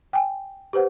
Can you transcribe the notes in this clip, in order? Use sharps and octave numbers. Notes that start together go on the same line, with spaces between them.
G5 G#5
G4 B4 C5 F#5